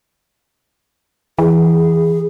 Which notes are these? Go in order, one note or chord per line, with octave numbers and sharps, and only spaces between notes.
E3 G#4